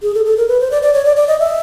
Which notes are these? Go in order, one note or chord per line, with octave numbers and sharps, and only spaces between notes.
G#4
A4
A4
A#4
B4
C5
D5
D5
C#5
D5
D5
D#5
E5